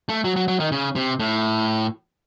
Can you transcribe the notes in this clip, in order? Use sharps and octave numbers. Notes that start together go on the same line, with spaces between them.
A3
F#3
F#3
F#3
D#3
C#3
C3
A2